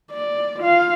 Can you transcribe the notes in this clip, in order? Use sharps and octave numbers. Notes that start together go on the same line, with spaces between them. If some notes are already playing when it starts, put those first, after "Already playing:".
D5
F4 F5